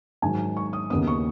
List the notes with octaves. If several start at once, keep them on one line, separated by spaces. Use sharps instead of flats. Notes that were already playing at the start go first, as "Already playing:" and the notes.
G#2 D#3 F#3 G#5
C#6
D#6
D#2 C#3 B3 D#6
C#6